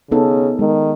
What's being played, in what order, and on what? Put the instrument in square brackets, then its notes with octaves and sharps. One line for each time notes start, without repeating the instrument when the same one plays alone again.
[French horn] C#3 [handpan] B3 D#4 A4
[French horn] D#3 [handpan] G#3